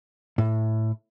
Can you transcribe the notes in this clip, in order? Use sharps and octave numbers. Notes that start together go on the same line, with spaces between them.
A2